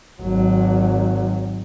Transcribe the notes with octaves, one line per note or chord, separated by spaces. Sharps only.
G#1 F#3